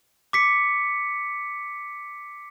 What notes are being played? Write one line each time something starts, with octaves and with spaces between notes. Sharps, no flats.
D6 B6 C#7